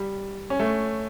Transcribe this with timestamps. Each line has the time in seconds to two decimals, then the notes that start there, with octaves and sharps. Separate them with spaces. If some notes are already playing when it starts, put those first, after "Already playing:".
Already playing: G3
0.50 C#4
0.60 A3